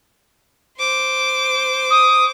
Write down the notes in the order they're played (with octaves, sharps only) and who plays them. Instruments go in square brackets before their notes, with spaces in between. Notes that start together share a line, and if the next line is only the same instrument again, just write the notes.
[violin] C5 D6
[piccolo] D#6